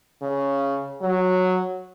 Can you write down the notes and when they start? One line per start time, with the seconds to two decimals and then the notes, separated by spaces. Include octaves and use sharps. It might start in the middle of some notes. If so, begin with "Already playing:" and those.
0.22 C#3
1.02 F#3